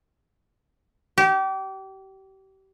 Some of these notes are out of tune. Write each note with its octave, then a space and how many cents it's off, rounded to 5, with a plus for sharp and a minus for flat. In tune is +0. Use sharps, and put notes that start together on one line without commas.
G4 -30